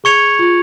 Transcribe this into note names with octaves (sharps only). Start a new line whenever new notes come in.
G#4 C#6 G#6 C#7 F7
F4